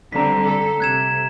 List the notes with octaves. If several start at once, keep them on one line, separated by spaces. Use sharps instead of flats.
D3 G3 C4 A#5 B6
A4
C3 F#6 G#6 E7